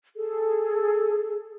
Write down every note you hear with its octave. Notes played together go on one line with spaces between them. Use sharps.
G#4 A4